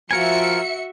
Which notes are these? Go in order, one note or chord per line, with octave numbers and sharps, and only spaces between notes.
F3 F4 F#4 A#4 E5 G#5 C#7